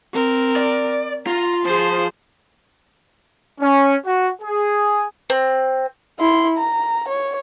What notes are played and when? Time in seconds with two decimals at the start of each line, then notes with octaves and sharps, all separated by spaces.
0.13 C4 A#4
0.56 D5
1.27 F4 A#5
1.65 F3 G#4 C5
3.60 C#4
4.06 F#4
4.42 G#4
5.30 C4
6.19 E4 C6
6.58 A#5
7.09 C#5